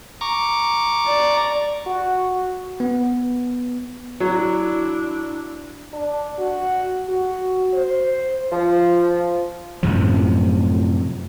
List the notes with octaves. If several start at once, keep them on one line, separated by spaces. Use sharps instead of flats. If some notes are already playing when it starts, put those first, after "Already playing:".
A#5 C#6 D6
D5
F#4
B3
F#3 D4 E4
D4
F#4
F#4
C5
F3
F#2 A2 C3 F3